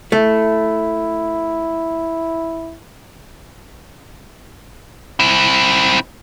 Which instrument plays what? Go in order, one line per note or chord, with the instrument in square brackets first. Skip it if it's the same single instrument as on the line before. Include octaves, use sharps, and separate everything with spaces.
[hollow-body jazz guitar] A3 [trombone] E4
[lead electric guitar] C4 E4